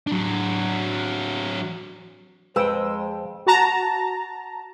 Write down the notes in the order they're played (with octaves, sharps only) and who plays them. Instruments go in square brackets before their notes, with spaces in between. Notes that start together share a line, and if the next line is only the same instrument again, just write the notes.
[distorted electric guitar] F#3 D4
[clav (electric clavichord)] F2 G5 [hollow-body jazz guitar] G#3 [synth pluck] B4 E6 [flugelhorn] C5
[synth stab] F#4 A5 A#5